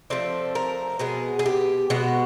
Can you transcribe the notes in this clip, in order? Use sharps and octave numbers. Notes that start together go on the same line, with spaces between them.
F3 A3 C4 D5
A#4
B2 G#3 B3 G#4
G#4
G4
B2 G#3 B3 F#4